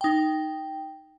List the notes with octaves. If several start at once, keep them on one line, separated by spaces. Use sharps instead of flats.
D#4 G5